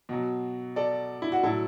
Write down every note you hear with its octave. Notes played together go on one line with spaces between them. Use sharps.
B2 F#3
A4 D5
E4
F#4
A2 F#3 E4 A4